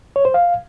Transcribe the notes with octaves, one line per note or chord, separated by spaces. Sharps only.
C#5
C5
F5